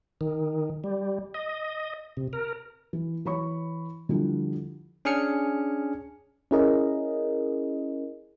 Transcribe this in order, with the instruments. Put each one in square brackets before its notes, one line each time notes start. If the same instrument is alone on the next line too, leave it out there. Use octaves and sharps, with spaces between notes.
[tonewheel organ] D#3
G3
D#5
C3
A#4
[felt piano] E3
E3 C#5 B5 C#6
D3 F3 G3 D4 E4
[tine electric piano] C#4 D4 G#4 G#5 F6 C#7
[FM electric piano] C#4 E4 G#4 A#4 D#5